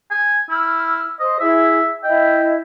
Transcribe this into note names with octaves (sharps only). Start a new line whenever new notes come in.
G#5
E4 E6 F6
C5 D#5
E4 G#4 E5
E4 D#5 G5